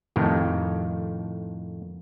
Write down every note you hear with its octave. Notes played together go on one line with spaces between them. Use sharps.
F2 A2 D#3